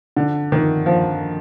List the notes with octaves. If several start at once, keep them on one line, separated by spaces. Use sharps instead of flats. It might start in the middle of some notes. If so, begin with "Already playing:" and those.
D3
D#3
F3